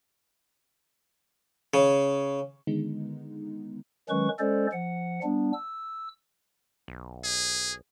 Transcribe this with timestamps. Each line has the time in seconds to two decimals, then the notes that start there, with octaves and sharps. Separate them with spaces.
1.74 C#3
2.67 D3 D#3 G#3 B3 D#4
4.09 D#3 F#3 G#3 C#4 B4 C#6
4.39 G#3 C#4 A4 C5 D5
4.73 F3 F#5
5.23 G3 B3 D4
5.53 E6
6.88 B1
7.24 G#4